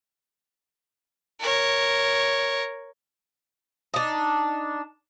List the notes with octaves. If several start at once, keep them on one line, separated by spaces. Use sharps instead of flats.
A#4 C#5
D4 D#4